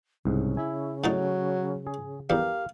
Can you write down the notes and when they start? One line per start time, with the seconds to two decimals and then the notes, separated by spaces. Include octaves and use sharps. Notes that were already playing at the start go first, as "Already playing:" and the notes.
0.25 C2 G#2 C#3
0.57 E4 G#5
1.04 A2 D3 F#3 D#4
1.87 G#4
2.30 E2 G2 G4 A#4 F5